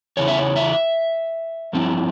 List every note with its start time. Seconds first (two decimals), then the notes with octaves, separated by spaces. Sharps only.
0.17 E2 C#3 E3 C#5
0.28 E5
0.38 C#5
0.56 E5
1.73 G2 F3 C4 E4